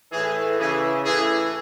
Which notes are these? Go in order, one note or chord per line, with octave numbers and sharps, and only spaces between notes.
A2 E3 G#4
C#3 E3 G#4
A2 E3 G#4